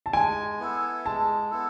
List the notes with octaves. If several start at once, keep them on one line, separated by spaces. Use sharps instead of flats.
A5
G#3 G#5
B3 E4 A4
G#3 A5
B3 E4 A4